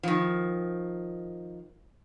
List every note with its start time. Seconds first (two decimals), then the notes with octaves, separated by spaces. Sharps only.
0.03 D#3 F3